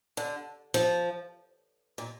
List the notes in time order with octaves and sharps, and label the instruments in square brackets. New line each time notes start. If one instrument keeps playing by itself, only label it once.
[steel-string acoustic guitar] D3
F3
A#2